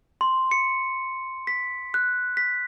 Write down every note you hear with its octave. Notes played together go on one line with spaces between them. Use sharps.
C6
C#7
B6
F#6
B6